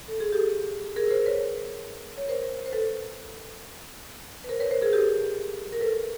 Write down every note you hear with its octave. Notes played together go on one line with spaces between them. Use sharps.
A4
G#4
G4 A4
G#4 A#4
A#4 C5
B4 C#5
C#5
A#4 C5
C5
A4 B4
B4
A#4 C5
B4 C#5
A#4 C5
G#4 A#4
G4 A4
A#4
A4 B4